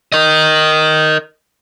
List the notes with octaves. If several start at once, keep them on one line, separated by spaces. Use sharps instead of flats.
A#4 D#5